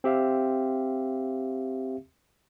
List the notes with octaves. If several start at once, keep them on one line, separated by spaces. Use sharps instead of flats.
C4 G4 E5 F5